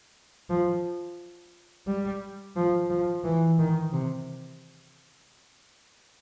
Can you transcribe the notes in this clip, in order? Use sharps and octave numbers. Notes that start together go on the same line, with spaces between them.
F3
G3
F3
F3
E3
D#3
C3